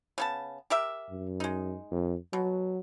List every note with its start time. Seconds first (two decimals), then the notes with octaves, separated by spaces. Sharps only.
0.18 C#3 B3 A5
0.70 G4 A#4 E5
1.10 F#2
1.40 G#3 D#4
1.91 F2
2.33 B2 F#3